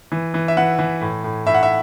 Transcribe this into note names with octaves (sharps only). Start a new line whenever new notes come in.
E3
E3
E5
E3 F#5
E3
A2
A2
A2 E5
F#5
E5